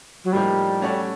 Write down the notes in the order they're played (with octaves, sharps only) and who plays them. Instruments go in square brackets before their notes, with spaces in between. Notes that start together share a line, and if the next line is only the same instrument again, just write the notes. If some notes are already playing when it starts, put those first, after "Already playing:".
[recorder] F#3
[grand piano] A2 F3 A#3 D#4 [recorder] G3
[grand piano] A3 C#4 F#4 A4 D5